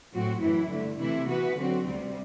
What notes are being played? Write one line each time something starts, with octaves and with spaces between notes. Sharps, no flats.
A2 F#3 C4 F#4
F#2 E3 A3 E4
G2 D3 A3
C3 E3 A3 E4
E3 B3 F#4 B4
D3 F#3 C4 F#4
D2 C3 G3 C4